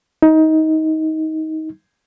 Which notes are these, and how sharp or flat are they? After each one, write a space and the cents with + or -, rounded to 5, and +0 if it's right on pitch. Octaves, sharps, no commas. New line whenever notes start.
D#4 +20